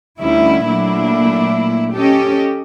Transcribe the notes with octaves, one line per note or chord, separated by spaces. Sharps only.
D2 D3 G3 C#4 D#4 E4
A#2 F#3 A3 A#3 D4 E4
C#4 G4 A4 D#5